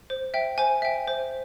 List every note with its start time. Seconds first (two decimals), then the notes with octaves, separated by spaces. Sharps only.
0.10 C5
0.34 E5 G5
0.58 C5 G#5
0.82 E5 G5
1.07 C5